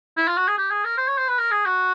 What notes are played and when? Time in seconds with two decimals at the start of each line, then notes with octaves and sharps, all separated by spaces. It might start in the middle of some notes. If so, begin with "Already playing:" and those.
0.17 E4
0.28 F4
0.37 F#4
0.48 G#4
0.58 G4
0.71 G#4
0.84 A#4
0.97 C5
1.08 C#5
1.18 C5
1.28 B4
1.38 A#4
1.51 G#4
1.66 F#4